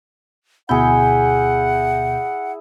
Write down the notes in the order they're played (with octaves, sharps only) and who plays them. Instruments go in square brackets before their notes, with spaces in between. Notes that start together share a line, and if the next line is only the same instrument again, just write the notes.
[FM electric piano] D2 B2 G6 [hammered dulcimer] E4 G#4 [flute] F#5